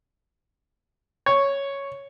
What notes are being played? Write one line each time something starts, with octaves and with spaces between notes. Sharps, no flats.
C#5